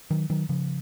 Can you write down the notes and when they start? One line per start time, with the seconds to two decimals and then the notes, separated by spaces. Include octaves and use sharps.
0.10 D#3 F#3
0.30 D#3 F#3
0.49 C#3 F3